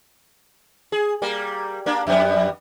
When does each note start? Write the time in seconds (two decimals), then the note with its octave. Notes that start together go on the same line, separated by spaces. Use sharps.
0.92 G#4
1.22 G3 A#3
1.86 A#3 D4
2.07 F2 G3 B3